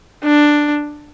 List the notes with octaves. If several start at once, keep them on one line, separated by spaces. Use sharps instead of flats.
D4